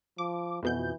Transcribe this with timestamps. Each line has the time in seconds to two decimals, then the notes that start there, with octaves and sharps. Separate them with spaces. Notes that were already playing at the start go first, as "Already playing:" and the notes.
0.18 F3 D6
0.63 F2 B2 E3 G6